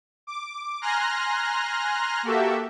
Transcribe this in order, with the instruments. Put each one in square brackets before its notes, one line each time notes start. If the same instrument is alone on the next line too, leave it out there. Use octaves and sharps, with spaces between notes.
[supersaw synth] D6
G#5 A#5 C6 F6 F#6 A#6
A#3 F#4 G4 A4 E5